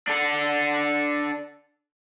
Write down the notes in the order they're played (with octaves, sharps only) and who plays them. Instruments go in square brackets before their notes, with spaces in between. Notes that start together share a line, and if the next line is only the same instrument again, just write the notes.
[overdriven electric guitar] D4 A4